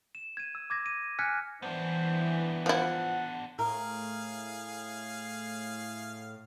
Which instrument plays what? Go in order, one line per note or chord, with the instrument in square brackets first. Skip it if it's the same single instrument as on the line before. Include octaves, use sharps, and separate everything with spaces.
[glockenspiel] E7
G#6 D#7
E6
D6 G#6 A#6
D#7
G#5 F6 F#6 G#6 B6 C#7
[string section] E3 [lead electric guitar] B3 D4 [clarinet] C5
[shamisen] F3 E4 [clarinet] F#5
[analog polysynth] A2 [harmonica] G#4 F5 [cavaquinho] A#4